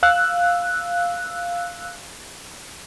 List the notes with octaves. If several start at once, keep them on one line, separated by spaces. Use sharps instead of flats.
F5 E6 F#6